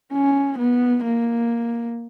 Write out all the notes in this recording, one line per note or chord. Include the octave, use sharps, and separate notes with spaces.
C#4
B3
A#3